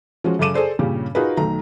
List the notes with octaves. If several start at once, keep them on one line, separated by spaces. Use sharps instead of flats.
F3 G#3 C#4 F#4
F#2 C#3 A4 D6 D#7 E7
G#4 A4 C5 D5
G2 A#2 C#3 C#4 G4
D#4 F4 F#4 G#4 A#4 B4
B1 D#3 A3 A#5